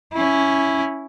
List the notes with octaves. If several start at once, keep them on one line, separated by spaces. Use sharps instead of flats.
C#4 E4